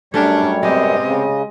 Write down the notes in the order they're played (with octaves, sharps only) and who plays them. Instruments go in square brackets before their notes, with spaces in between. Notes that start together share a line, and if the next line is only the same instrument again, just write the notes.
[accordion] F#2 G3 [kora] A3 C#4 A#4 [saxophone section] D4 [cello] C#5
[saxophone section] C3 B3 C4 [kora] G#3 G4 [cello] D#5
[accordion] C#3